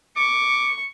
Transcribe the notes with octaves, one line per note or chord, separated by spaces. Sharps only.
C#6 D6